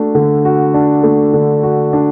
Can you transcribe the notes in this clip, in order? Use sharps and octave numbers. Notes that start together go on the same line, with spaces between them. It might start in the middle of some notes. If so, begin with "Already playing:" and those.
Already playing: A3 D4 F#4
D3
F#4
D4
A3
D3
F#4
D4